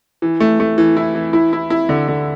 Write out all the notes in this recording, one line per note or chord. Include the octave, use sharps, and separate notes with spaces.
E3
A3
A3
E3
E4
E3
E4
E4
E4
D3
D3